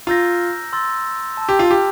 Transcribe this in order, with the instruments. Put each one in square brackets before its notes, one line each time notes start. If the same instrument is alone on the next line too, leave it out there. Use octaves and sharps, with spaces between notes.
[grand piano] F4 [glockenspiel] A#5 E6 G6 A#6
[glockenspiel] C6 E6 A6
A5 C6 E6
[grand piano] G4
F4
G4